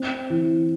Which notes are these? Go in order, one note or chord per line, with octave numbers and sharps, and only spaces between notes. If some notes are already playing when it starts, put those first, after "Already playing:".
Already playing: C4
E3